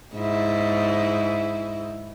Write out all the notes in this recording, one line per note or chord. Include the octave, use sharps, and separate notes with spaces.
G#2 E4